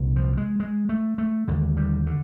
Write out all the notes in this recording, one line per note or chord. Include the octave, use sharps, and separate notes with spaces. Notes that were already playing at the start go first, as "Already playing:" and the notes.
Already playing: C2 A#2
F3
G#3
G#3
A3
A3
D#2 D3 G#3
G3
D3